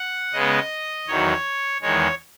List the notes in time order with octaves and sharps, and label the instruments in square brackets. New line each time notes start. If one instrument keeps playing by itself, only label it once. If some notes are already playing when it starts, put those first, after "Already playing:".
Already playing: [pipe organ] F#5
C#3 G#3 B3 D#5
E2 D#3 F#3 C#5
E2 D#3 G#3 C#5